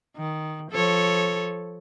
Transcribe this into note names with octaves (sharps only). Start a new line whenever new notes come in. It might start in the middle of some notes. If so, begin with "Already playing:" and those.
D#3
F3 A4 C#5